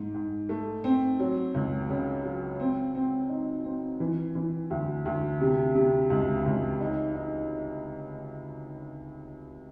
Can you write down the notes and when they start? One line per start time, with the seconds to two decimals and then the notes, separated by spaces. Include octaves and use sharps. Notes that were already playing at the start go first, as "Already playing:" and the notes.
Already playing: G#2
0.14 G#2
0.49 A3
0.84 C4
1.19 F#3
1.54 C#2
1.89 C#3
2.24 F#3
2.60 C4
2.95 C4
3.29 D#4
3.65 C4
4.00 E3
4.35 E3
4.70 D2
5.05 D2
5.41 C3
5.75 C3
6.10 C#2
6.46 C#2
6.81 D#4
7.15 D#4